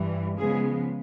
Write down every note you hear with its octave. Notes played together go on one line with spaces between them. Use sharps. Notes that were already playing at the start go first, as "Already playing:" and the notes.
Already playing: G2 E3 G3
C#3 F3 G#3 B3 G#4